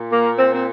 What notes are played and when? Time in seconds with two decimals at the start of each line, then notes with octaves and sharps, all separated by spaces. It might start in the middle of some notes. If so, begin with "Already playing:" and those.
Already playing: A#2
0.12 A#3
0.39 C4
0.54 C4